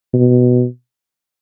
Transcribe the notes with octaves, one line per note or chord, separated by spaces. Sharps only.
B2